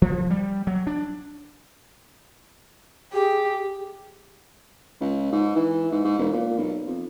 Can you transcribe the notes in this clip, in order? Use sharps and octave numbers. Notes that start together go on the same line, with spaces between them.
F3
G3
F#3
D4
G4 G#4
C#2
G#2
E3
G#2
G#2
E1
A#2
B1
F2